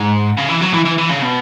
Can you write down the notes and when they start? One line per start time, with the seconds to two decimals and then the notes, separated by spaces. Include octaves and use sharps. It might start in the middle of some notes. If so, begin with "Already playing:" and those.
Already playing: G#2
0.38 C#3
0.50 E3
0.62 F#3
0.73 E3
0.85 E3
0.98 E3
1.09 C#3
1.22 B2